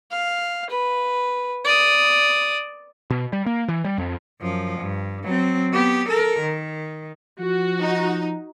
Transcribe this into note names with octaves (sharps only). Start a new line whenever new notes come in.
F5
B4
D5 D#6
B2
G3
A#3
E3
G3
F2
F#2 F3
G2
F#3 C4
B3 G4
A4 A#4
D#3
F3 F#4
D#4